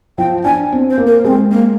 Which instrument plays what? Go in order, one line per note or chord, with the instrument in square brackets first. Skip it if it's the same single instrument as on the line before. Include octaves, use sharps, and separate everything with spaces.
[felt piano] F3 [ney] G5
[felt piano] D4 [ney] G#5
[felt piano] C4
[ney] C5
[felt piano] A#3
[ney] A#4
[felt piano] G#3 [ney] C4
[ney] A#3